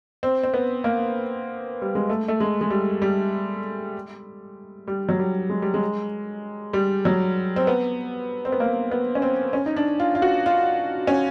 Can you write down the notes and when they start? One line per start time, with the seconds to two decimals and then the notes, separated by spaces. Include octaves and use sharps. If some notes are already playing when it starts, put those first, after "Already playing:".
0.23 C4
0.43 C4
0.54 B3
0.84 A#3
1.82 G3
1.95 G#3
2.09 A3
2.28 A3
2.40 G#3
2.61 G#3
2.70 G3
3.02 G3
4.88 G3
5.09 F#3
5.19 G3
5.50 G#3
5.62 G3
5.74 G#3
6.73 G3
7.05 F#3
7.56 C4
7.67 B3
8.45 C4
8.52 B3
8.60 A#3
8.91 B3
9.15 C#4
9.22 C4
9.53 C#4
9.66 D#4
9.76 D4
10.00 F4
10.15 F4
10.22 F#4
10.46 F4
11.07 C#4